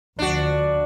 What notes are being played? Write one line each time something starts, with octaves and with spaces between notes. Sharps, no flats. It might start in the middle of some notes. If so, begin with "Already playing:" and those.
D2 F3 D4 F#4